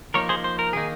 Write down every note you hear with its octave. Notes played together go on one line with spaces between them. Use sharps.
F3 A#3 D#4 A#4 C#5
G#4 C5
C5
A#4
D#3 A#3 D#4 G#4